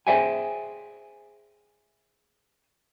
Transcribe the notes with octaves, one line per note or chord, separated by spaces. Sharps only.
G#4 C5 D5 E5 G5 G#5